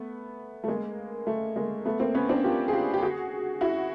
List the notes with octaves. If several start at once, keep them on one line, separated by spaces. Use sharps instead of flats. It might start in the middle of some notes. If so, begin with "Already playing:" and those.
Already playing: A3 B3
A3
G#3 A#3
A3
G#3 A#3
A3 B3
A#3 C4
B3 C#4
C4 D4
F4 G4
G#4
F4 G4
G4
F#4 G#4
E4 F#4